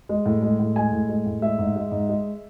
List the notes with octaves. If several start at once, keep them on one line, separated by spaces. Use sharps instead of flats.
G#3
A2
G#3
A2
G#3 G#5
A2
G#3
A2
G#3 E5
G#2
G#3
G#2
G#3